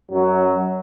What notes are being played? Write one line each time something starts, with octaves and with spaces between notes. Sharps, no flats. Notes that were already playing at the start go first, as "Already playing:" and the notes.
F#2 F#3